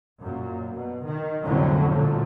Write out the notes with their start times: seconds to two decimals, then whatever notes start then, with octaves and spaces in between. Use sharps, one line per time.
0.20 F#2 A#2
0.74 B2
1.05 D#3
1.43 C2 F2 A2 D3 F#3 C#4
1.92 A#2 D3 F3 F#3 A3